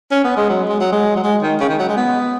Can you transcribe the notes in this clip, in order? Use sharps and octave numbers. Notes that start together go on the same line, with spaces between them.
C#4
B3
G#3
F#3
G#3
F#3
G#3
F#3
G#3
D#3
C#3
D#3
F#3
G#3
B3